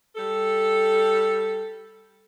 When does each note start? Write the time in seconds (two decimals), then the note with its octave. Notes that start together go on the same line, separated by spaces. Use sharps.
0.14 G3 A4